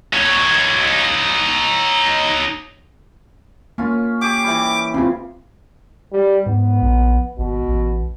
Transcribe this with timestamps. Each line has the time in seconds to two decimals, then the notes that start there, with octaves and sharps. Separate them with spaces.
0.13 D#4 C#5
3.78 A#3 C#4 F4
4.22 G4 G#4 D6
4.44 E3 G3
4.94 C#3 C4 F4
6.12 G3
6.46 G#2 B3
6.82 A#1
7.38 G#1 B2
7.68 A1